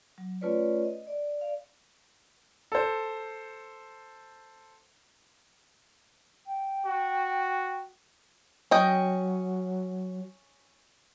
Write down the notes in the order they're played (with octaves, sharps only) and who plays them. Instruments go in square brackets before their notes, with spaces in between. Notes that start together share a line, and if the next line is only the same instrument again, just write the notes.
[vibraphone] F#3
A3 C#4 F4 B4 C#5 D5
D#5
D5
D5 F5
[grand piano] A4 C5
[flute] G5
[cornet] F#4
[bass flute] F#3 [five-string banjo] C#4 D#5 G5